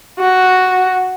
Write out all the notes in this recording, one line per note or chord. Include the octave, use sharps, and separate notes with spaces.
F#4